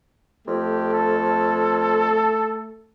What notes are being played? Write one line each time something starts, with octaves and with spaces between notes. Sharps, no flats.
F2 A3 G4
A4